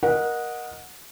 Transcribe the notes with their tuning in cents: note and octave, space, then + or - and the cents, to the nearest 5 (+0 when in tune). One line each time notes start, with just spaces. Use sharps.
A#4 +20 D#5 +0 F#5 -15